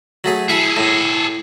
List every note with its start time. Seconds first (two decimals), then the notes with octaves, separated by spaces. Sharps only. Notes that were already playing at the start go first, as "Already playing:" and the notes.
0.24 F#3 A3 G#4
0.49 E4 G#4 A4
0.77 A2